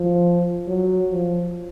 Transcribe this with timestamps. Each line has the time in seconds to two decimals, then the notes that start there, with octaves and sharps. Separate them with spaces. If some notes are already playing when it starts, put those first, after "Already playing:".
Already playing: F3
0.68 F#3
1.11 F3